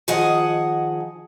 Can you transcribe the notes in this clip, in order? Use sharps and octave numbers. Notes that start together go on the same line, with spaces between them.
D#3 F3 G#4 D#5 F#5 G#5